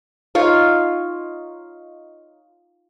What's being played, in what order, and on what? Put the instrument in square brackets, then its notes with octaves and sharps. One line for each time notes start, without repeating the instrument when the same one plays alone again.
[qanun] D#4 F4 C#5